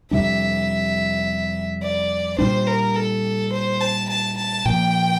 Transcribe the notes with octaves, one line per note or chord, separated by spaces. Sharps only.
F2 C3 G3 D4 E5
D5
A#2 G3 D4 C5
A#4
A4
C5
A5
A5
A5
A#2 F3 A#3 G5